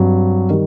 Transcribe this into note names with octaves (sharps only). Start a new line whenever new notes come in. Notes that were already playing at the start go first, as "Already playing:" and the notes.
Already playing: G2 F#3 C4
D#3 G3